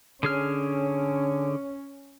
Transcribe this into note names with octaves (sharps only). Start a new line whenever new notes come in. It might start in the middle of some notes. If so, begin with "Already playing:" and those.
D3 C#4 G#4 F6